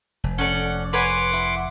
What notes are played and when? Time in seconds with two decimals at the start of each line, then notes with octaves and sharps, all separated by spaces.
0.24 F1
0.38 C#4 A4 D5 F#5
0.93 B4 C#5 F#5 G#5 C6 D6
1.33 E4